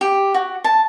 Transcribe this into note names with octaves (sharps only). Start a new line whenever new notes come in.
G4
F#4
A5